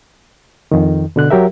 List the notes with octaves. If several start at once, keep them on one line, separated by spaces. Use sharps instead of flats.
F2 D#3
B2 D3 F#6
F#3 G4 A#4 E5